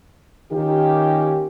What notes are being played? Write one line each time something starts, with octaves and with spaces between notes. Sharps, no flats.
D#3 A#3 C#4 F4 G4